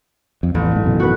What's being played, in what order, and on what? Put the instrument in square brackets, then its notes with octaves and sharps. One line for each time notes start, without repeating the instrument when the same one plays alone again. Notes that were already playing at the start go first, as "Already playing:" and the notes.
[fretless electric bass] F2
[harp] A1 [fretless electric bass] E2 A2
[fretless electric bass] E2 G#2
F#2 B2 D#3
[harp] F#4 B4